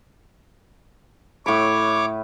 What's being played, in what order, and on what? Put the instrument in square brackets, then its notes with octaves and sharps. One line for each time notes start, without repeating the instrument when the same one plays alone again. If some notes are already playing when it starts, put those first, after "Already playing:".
[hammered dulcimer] A2 B5 [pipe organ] C#5 D6